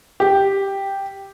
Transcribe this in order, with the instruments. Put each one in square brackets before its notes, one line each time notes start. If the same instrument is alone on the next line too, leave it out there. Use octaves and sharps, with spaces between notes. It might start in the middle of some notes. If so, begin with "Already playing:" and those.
[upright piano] G4